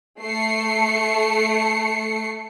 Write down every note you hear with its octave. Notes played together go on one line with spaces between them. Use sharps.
A3 C7 C#7